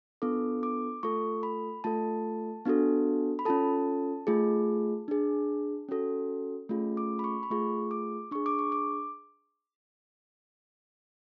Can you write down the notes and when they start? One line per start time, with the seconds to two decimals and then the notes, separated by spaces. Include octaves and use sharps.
0.22 B3 D4 F4 A4 D6
0.63 D6
1.03 A3 F4 A4 C#6
1.43 B5
1.84 A3 F4 A4 A5
2.65 B3 D4 F#4 A4
3.39 B5
3.45 C#4 F4 A4 A5
4.27 A3 F4 G#4
5.08 D4 G#4
5.89 C#4 F#4 A4
6.69 A3 C#4 F4 G#4
6.97 D6
7.19 B5
7.24 C#6
7.43 B5
7.50 A3 F4 G#4 C#6
7.91 D6
8.31 D4 G#4 C#6
8.46 D6
8.59 C#6
8.72 D6